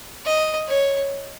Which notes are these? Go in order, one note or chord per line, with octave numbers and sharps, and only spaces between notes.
D#5
C#5